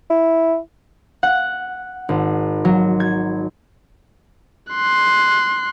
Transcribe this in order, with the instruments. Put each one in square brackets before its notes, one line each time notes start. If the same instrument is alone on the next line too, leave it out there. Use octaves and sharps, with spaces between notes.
[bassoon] E4
[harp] F#5
G#1
F#3
G#6
[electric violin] C6 F#6